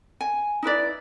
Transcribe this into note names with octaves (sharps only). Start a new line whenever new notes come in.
G#5
D#4 E4 B4 D5